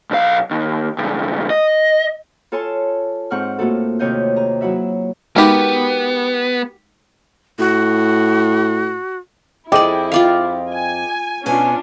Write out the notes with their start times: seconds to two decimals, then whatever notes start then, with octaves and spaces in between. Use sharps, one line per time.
0.11 B1 F5
0.51 D#2
0.98 C#2 G2
1.50 D#5
2.52 F4 A4 C#5 G#5 A5 C6
3.30 G#2 C4 F#5 C#6 F6
3.59 A2 A3 A#3 F4 F#4 A4
3.99 D#2 C3 C#5 D#5 F5 G6
4.36 G#4 A#5
4.61 F#3 E4 F#4 E5
5.36 G#3 B3 D#4 F#4 G4 A#4
7.59 A2 F#4
9.72 F2 E4 G#4 D5 D#5 G5 D6
10.12 F4 D5 F5
10.70 G#5
11.46 B2 C#4 D4 F4 G#5